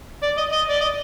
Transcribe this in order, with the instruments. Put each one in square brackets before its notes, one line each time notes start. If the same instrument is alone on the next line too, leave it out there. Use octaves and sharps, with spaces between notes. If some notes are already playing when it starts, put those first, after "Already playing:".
[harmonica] D5
D#5
D#5
D5
D#5